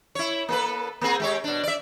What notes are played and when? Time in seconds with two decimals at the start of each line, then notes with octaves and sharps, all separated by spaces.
0.15 E4 C#5
0.49 A#3 A4 B4
1.01 A#3 C4 G#4
1.20 G#3 G4 C#5
1.44 B2 D4
1.63 D5 E5